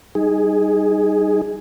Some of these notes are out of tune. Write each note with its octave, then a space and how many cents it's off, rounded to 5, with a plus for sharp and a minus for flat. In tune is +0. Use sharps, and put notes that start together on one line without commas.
G3 +0 D#4 +0 G#4 +0